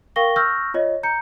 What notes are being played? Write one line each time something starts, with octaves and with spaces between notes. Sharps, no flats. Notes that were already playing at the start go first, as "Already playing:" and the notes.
A#4 F5 G5 C#6 A#6 G7
C#6 E6 F6 G6 A#6
F4 C#5 D#5
A#5 G6 C#7